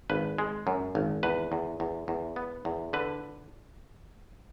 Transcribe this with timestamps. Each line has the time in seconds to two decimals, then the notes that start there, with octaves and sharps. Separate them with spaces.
0.10 G#1 B4
0.38 G#3
0.67 F#2
0.95 G#1
1.23 E2 B4
1.52 E2
1.80 E2
2.08 E2
2.36 B3
2.65 E2
2.93 D3 B4